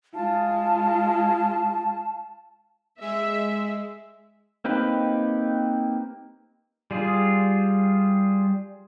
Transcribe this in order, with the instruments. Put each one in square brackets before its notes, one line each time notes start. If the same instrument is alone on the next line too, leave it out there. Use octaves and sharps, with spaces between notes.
[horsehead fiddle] G#3 F4 [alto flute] A5
[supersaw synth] G#3 [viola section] E5
[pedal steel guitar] A#3 C4 D#4 G4 B4
G3 F4 G#4